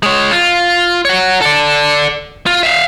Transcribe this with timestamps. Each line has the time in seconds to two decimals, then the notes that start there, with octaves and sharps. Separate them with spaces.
0.03 G#3 C#5
0.31 F4
1.05 C#5 F#5
1.41 A4 D5
2.46 F4
2.63 E5 F5